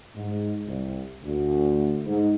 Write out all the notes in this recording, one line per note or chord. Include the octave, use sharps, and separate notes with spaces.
G#2
C2
D2
G#2